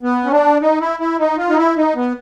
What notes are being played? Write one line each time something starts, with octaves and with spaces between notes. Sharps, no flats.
B3
C#4
D4
D#4
E4
E4
D#4
F4
D#4
E4
D#4
B3